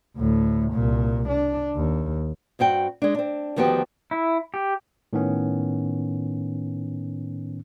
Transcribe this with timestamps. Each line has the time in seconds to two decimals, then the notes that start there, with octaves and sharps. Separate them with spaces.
0.16 D2 A2
0.72 C2 A#2
1.29 D4
1.76 D#2
2.59 G2 C4 F#4 G5
3.02 G#3 D4
3.14 C4 D4
3.56 D2 D#3 F3 B3 F#4 G4
4.11 E4
4.54 G4
5.13 A2 D#3 B3 C#4